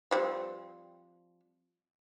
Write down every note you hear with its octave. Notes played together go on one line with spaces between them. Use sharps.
F3 G3 C4